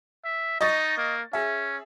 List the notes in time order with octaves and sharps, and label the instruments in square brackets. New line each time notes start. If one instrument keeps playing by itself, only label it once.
[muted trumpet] E5
[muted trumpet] D#4 [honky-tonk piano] D#5 C#6 A6
[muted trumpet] A#3
[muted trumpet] C#4 [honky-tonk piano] G#4 E5